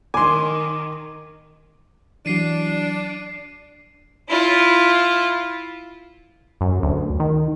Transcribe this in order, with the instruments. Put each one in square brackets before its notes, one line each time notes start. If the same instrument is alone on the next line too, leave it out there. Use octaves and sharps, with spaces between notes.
[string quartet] D#3 [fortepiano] G#5 C6 [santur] D6
[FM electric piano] E3 F#3 [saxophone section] D4 [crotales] C7 D#7
[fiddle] E4 F4
[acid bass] F#2
D2
D#3